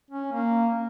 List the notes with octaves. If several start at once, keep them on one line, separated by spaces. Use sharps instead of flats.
C#4
A#3